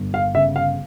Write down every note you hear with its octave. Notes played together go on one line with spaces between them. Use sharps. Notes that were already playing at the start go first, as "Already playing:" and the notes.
Already playing: G1
F5
C#3 E5
F5